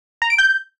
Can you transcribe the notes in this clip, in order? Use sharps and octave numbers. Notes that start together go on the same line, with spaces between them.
A#5
D7
G6